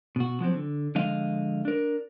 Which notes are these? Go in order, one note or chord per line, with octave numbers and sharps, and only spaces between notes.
B2 F#4
F3 F#3 C4
D3
D3 F3 G#3 D#5 F5
D4 A#4